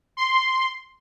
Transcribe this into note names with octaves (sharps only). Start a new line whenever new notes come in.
C6